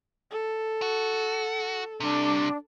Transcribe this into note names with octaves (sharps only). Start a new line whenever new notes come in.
A4
F#4
C3 G3 D4